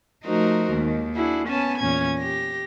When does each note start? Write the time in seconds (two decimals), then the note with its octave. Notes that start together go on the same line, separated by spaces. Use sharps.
0.24 F3 A3 D#4 F#4 A#4 C5
0.71 D#2 D#3 G#3
1.15 D4 E4 F#4 G#4
1.46 B3 C#4 G#5 A5
1.76 E2 A#2 C#4 G#6
2.18 G4 A#6